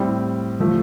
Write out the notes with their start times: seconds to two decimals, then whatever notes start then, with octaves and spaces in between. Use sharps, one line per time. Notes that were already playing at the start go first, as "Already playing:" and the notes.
Already playing: A2 G3 C4
0.60 F3 A3